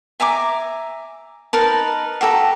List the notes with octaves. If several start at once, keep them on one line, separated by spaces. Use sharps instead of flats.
E5 G#5 A#5 D6
D#4 A#4 B4 A5
F#4 G4 A4 A#5